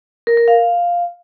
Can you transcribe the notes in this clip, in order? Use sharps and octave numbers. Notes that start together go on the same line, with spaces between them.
A#4
A#4
F5